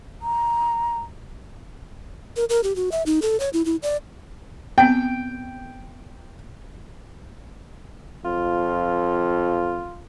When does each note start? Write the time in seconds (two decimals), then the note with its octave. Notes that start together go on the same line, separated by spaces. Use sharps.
0.22 A#5
2.36 A#4
2.49 A#4
2.63 G4
2.76 F#4
2.92 E5
3.06 D#4
3.22 A4
3.40 C#5
3.53 E4
3.65 E4
3.83 D5
4.78 B3 C4 G5
8.25 F2 F4